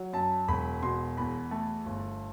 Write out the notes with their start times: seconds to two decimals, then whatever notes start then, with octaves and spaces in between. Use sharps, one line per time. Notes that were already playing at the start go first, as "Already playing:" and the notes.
Already playing: F#3
0.13 F#2 A5
0.48 E1 B5
0.83 B2 C6
1.17 E2 B5
1.51 A3
1.86 G1